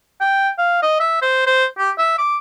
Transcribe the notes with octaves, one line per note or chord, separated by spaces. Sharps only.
G5
F5
D#5
E5
C5
C5
G4
E5
D6